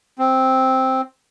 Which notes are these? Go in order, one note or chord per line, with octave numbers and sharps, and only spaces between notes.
C4